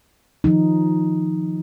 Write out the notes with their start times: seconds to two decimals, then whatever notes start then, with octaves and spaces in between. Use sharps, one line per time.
0.44 D#3 F3 D#4